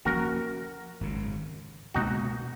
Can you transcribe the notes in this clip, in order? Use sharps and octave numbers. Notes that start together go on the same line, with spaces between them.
F#2 F3 A#3 C#4 F#4 A#4
G#1 F#2 C#3
C#2 B2 A#3 D#4 F#4